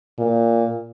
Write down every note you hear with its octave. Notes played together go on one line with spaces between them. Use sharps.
A#2